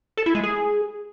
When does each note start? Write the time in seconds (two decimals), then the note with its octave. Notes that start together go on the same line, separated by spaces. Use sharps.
0.17 A4
0.26 E4
0.35 G#3
0.43 G#4